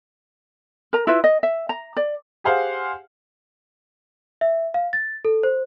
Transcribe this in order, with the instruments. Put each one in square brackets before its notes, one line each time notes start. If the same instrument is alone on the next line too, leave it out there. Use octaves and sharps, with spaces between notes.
[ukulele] A#4 A#5
E4 F4 B4 E5
D#5
E5
A#5
D5
[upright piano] G4 G#4 C5 F5 F#5
[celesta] E5
F5
A6
A4
C5